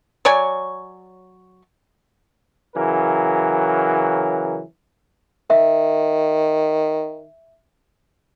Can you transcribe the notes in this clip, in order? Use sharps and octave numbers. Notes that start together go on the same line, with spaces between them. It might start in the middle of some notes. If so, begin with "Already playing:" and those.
F#3 C#5 D5 G#5
C#3 E3 F#3 A#4
D#3 E5